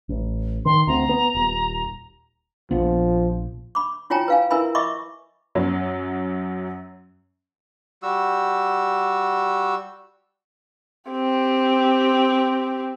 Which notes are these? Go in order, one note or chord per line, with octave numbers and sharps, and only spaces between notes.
A1
D#3 C6
D2 C4 A#5
B3
D#1
A#1 F3 B3
B5 D6
E4 F4 C#5 G5 G#5 A#5
B4 F5 G#5
E4 A#4 B4 E5 G#5 B5
D#5 E5 B5 C#6 D6
F#2 F#3
G3 F#4 E6
C4 G4